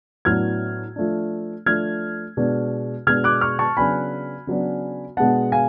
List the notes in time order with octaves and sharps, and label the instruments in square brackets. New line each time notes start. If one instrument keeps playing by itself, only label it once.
[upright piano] A2 F#3 B3 D4 F6 G#6
F3 A3 D4
F3 A3 D4 F6 G#6
B2 G#3 D4
B2 G#3 D4 F6 G#6
D6 F#6
C#6 F6
A5 C#6
C#3 F#3 B3 D4 G#5 B5
C#3 F#3 B3 D4
B2 G#3 B3 D4 F#5 A5
F5 G#5